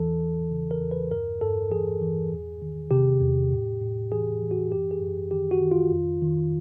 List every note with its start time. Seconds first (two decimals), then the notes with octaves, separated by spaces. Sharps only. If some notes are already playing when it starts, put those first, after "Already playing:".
Already playing: E2 E3 A4
0.20 E3
0.51 C#3
0.71 A#4
0.80 E2
0.91 B4
1.11 G2 A#4
1.41 G2 A4
1.71 E3 G#4
2.02 E3
2.31 E2
2.62 D#3
2.91 C3 G4
3.21 E2
3.52 A2
3.81 A2
4.12 E3 G#4
4.42 E3
4.51 F#4
4.72 F#2 G4
4.91 G#4
5.02 F#2
5.31 D#3 G4
5.51 F#4
5.61 D#3
5.71 F4
5.91 F2
6.22 D#3